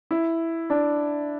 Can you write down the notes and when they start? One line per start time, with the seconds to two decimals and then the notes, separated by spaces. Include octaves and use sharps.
0.11 E4
0.70 D4